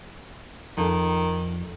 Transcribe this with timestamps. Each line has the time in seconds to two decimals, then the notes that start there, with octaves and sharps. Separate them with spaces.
0.78 F2 D#3